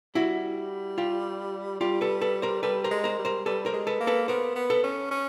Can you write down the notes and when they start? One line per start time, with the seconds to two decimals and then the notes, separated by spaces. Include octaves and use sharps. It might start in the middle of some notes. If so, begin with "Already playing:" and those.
0.15 G3 E4 F#4
0.98 F4 G4
1.81 G3 F4 G4
2.01 A4 B4
2.21 A4 B4
2.42 A#4 C5
2.63 G3 A4 B4
2.84 A#4 C5
2.91 G#3
3.04 A#4 C5
3.19 G3
3.25 A#4 C5
3.46 G3 A4 B4
3.66 A#4 C5
3.73 G#3
3.87 A4 B4
4.00 A#3
4.07 A4 B4
4.28 B3 A#4 C5
4.55 B3
4.70 A4 B4
4.84 C#4
5.11 C#4